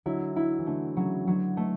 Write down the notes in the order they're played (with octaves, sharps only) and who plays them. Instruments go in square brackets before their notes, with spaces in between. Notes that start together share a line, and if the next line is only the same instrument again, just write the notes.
[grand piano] D3 F#3 [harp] E4
[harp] E4
[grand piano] E3
[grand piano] D3 [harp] A3
[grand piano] C#3 [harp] F#3
[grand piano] D3 [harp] F#3
[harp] A3